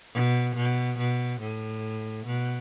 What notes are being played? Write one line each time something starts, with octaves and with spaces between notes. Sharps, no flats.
B2
B2
B2
A2
B2